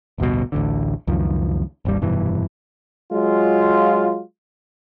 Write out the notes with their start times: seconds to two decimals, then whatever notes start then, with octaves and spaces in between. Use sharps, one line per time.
0.18 A1 D2 G2 B2
0.52 A1 D2 D3
1.07 C#2 F#2 D#3 F3
1.85 G#1 D#2 G3
2.01 F1 G2 B2 E3
3.13 F#3 G#3 F4